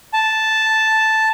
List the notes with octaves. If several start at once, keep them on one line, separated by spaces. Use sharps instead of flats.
A5